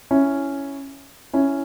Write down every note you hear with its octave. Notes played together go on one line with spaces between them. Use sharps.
C#4 E4
C#4 E4